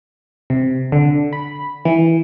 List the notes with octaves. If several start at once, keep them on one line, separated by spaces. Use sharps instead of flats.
C3
D3
B5
E3